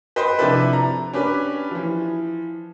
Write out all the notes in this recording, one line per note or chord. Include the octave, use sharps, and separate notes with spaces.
B4 C5 D#5 G5 C6
C3 F3 D4 E4 A4 B4
A#5
C#4 D4 G4 B4
E3 F3